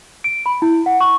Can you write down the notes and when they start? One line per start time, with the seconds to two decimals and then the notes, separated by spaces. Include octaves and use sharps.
0.24 D7
0.46 B5
0.62 E4
0.86 F#5
1.01 C#6